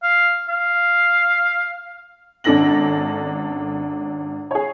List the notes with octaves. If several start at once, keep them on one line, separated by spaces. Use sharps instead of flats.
F5
F5
G#1 C#4 D4 A4 A#6 F#7
G#4 C#5